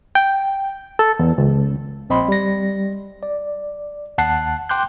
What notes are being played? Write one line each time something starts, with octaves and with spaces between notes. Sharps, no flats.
G5
A4
E2
C#2
A#1 C4 D#5 B5 C6
G3 A#6
D5
D#2 F#5 A5 F#6 C7
G5 C6 D6 F#6 G6